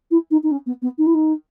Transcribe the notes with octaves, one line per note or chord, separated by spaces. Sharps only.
E4
D#4
D#4
C#4
B3
B3
D#4
E4
D#4